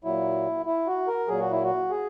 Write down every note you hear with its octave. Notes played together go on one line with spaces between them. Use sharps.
A#2 F#3 E4
E4
F#4
A#4
A#2 F#3 G#4
F#4
E4
F#4
G#4